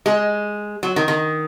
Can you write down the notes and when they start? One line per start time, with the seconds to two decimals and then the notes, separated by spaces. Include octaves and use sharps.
0.06 G#3
0.83 F#3
0.96 D#3
1.08 D#3